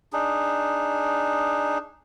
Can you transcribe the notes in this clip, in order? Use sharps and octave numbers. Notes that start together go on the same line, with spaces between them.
D4 D#4 G#4